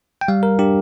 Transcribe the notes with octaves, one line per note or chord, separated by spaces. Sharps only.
G5
G3 F5
A#4
D4 G4